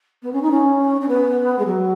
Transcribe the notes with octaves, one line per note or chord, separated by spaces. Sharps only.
B3
C#4
D#4
C#4
C#4
B3
G#3
F#3